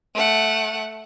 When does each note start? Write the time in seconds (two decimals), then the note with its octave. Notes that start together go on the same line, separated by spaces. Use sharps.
0.14 A3 F#5